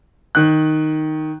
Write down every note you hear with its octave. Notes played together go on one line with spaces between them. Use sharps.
D#3 F#6